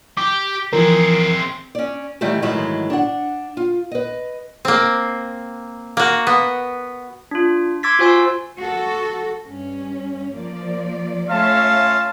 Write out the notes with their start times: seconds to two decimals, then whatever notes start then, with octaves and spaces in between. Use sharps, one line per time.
0.17 G4 D6
0.73 E3 F3 C4 G#4 A#4
1.75 C#4 D5
2.21 D#3 E3 F#3 G3 A3
2.42 G#2 D#3 E3 F#3 G#3 A3
2.90 D4 F#5
3.57 F4
3.91 B4 D#5
4.65 A#3 C4
5.97 A#3 F#4
6.27 B3
7.31 D4 F4
7.83 C6 D6 E6 G#6 A6 B6
7.99 F4 F#4 C5 G#5 C6 E6
8.58 F#4 A4
9.47 G2 C#4
10.35 F3 A#3 D5
11.29 A3 C#4 F4 C#5 E5 F5 A5